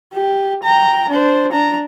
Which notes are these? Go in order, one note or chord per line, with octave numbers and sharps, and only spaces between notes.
G4
G5 A#5
D4 C5
D4 A#5